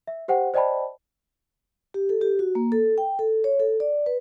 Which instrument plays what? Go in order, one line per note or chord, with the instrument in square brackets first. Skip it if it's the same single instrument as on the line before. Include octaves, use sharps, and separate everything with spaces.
[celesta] E5
G4 C5 F#5 G5
C5 D5 D#5 G5 A5 B5
[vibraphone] G4
A4
G4
F#4
A#3
A4
G5
A4
C#5
A4
D5
B4